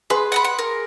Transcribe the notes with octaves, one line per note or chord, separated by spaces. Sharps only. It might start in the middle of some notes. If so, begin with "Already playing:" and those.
G#4 B4 C6
F#5 A#5 B5
F#5
A#4